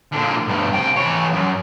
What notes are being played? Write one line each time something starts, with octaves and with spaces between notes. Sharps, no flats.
A#2 D3
G2 B2
C2 G5
E3 C#5
F#2